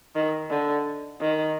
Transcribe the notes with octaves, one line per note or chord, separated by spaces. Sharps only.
D#3
D3
D#3